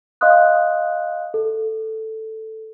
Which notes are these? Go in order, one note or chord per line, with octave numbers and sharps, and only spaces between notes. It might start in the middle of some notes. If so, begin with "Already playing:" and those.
D#5 F5 C6 D#6 F#6
A4